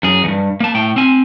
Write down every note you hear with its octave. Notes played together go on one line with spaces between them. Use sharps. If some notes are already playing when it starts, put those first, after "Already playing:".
F#2 G#4
E2 G2
A#3 A5
A2 G5
C4 G#5